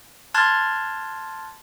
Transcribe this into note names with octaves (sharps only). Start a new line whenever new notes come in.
A5 C6 F6 F#6 G#6 A6